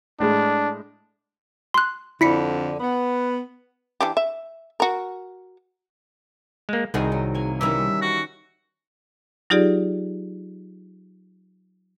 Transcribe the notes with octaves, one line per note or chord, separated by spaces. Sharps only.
A2 G#3 D4
C6 F#6
F2 D3 E4 B6 C#7
B3
E3 D4 G4
E5
F#4 A#4
G#3 A#3
C2 D#3 G#3 D#4 F#4 G#4
F#3
A#3 G#5
D#3 E3 G3 C#4 A#4 E5
F#4
F#3 D#4 F4 G4 G#4 D5